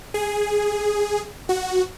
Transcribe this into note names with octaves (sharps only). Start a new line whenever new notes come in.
G#4
F#4